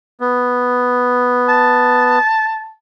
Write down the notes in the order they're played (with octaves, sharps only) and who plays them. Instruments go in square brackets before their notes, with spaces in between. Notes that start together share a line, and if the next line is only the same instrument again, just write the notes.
[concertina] B3
[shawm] A5